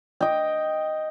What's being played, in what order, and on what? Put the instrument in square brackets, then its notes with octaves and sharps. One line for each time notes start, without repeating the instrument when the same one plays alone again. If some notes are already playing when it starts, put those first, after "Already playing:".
[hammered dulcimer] D#5 G5